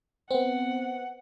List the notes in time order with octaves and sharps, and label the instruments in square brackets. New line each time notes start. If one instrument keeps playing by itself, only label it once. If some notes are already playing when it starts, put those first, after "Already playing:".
[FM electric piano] B3 C4 [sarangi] F#5